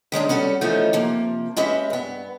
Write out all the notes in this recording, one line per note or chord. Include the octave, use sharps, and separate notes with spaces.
D#3 G#3 C#4 D4
G3 C#4 F#4 A4
E3 F3 A3 B3 C#4 D#4
C3 F3 A#3
G#3 C#4 F#4 G4 B4 E5
G2 B3